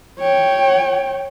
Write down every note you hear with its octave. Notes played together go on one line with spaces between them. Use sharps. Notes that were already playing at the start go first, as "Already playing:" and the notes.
C#5 G5